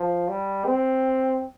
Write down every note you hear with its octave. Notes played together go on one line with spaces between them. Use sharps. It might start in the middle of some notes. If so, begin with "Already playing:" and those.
Already playing: F3
G3
C4